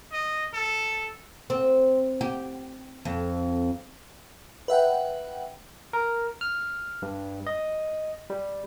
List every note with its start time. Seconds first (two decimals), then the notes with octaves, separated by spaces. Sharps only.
0.12 D#5
0.54 A4
1.50 C4
2.21 G4
3.05 F2
4.68 B4 E5 F#5 G5
5.93 A#4
6.41 F6
7.02 G2
7.47 D#5
8.30 G3